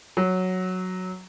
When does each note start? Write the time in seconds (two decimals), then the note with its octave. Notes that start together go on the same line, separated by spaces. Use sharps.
0.17 F#3